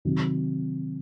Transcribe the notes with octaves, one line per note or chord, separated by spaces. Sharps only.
C3 D#3 F#3